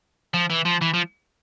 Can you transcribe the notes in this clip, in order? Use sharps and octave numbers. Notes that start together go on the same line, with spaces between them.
F3
E3
F3
E3
F3